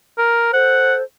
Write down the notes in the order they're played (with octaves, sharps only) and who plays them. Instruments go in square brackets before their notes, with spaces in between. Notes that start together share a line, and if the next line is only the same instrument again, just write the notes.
[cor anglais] A#4
[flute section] A4 C5 [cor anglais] F#5